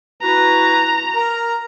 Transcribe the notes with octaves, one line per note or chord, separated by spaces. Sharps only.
E4 F#4 B4 A#5
A#4 A#5